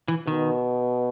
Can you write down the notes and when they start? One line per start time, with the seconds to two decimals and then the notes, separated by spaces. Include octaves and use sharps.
0.08 E3
0.27 B2 D#3